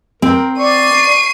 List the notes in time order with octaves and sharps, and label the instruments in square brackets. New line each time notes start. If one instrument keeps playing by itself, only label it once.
[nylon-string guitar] C4 [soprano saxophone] A#4
[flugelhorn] D5 [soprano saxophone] C#6 [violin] C7 D#7